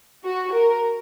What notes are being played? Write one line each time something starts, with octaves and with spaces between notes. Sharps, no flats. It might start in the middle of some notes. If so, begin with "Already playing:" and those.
F#4
A#4